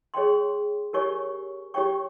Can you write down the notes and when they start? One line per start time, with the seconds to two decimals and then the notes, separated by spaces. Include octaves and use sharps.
0.14 G#4 C#5 G5 C6
0.93 G4 A#4 C#5 G#5 C#6
1.74 G4 C#5 G5 C#6